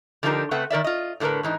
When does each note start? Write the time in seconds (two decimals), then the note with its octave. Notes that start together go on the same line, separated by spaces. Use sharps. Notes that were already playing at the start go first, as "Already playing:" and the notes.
0.23 D3 F3 D#4 E4 G4 A#4
0.51 C#3 A3 C4 B4 F#5
0.70 D#3 A#4 D5 E5
0.84 F4 D#5
1.20 A2 D3 A3 G#4 A#4 B4
1.43 G#2 E3 D#4